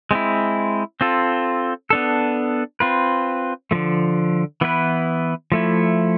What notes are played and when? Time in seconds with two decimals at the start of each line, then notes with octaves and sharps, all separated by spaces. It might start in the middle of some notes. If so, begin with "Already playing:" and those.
0.11 G#3 C4 E4
1.01 C4 F4 A4
1.90 B3 D4 A4
2.80 C4 F4 B4
3.71 D3 F3 A3
4.61 E3 B3 E4 B4
5.52 F3 A3 E4